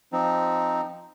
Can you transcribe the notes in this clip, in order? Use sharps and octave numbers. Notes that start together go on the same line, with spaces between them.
F3 C4 D#4